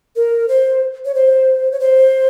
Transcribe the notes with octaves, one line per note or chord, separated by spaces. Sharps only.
A#4
C5
C#5
C5
C#5
C5